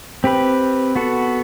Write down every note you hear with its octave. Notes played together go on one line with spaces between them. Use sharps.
C4 G4 B4
B3 F#4 A4